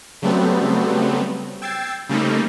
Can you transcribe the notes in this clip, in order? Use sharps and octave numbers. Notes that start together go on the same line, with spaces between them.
C#3 F#3 G3 A3 B3 C4
G5 E6 G#6 A6 C7
C#3 G3 A3 A#3 C4 D#4